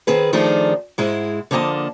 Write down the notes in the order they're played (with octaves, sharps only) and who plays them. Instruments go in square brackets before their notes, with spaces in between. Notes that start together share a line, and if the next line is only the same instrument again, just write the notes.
[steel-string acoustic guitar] D#3 C4 G#4 B4
D#3 F3 A3 D4 D#4 G#4
G#2 G#3 E4
D3 F3 A#3 D#5 G#5 A5